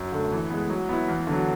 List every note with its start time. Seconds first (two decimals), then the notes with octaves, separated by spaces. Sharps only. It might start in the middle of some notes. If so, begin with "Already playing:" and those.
Already playing: F#2
0.12 D3 A3
0.32 E3
0.50 G#3 B3
0.69 F#3
0.89 B3 E4
1.08 E2
1.27 D3 F#3